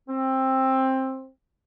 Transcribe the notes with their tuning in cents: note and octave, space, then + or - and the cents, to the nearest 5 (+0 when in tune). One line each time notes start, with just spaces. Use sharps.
C4 +15